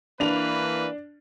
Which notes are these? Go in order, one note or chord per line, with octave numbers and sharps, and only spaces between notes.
E3 A#3 D4 B4 F7